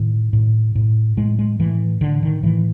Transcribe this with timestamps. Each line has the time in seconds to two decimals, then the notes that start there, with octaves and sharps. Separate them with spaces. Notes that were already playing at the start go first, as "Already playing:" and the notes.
Already playing: A2 D#3
0.33 A2
0.75 A2
1.17 A2 G#3
1.39 G#3
1.59 A2 E3
2.01 A2 D3
2.23 D#3
2.43 A2 E3